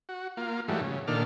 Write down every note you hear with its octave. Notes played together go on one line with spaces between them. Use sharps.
F#4
A#3 F4
G#2 E3 F#3 G3 A3
C#3
A#2 D#3 D4 A4 F6